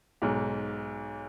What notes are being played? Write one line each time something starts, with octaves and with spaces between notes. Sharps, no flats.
B1 G#2